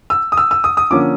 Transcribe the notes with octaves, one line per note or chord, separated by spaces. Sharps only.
E6
D#6
E6
E6
D#6
D#6
D3 F3 A#3 C#4 D6